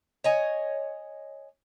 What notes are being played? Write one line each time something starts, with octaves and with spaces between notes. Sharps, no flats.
C#5 D#5 G#5